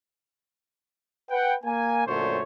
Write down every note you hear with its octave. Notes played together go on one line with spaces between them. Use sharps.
B4 F#5 G5
A#3 G#5
F#2 A#2 D3 A3 C5 C#5